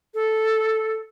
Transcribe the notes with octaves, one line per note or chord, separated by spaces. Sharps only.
A4